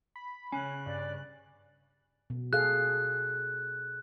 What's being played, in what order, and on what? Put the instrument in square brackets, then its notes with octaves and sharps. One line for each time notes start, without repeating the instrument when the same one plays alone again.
[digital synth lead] B5
[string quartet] C#3 F#6 [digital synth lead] C#4 [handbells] G#5 B5
[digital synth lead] G2 [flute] D5
[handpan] B2
[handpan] G#4 A4 F5 [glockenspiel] F#6